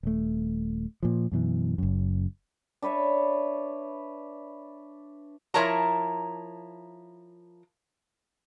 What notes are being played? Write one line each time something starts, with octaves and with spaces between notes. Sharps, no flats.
D#1 A3
A#2 F3
F#2 B2 E3
F#1 F#2
D4 B4 C#5 E5
F3 E4 A#4 C#5 A5 A#5